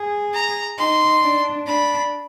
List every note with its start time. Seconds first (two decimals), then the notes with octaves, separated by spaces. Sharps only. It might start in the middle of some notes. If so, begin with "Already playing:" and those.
Already playing: G#4
0.34 A#5
0.78 D#4 C6
1.23 D4
1.67 D4 B5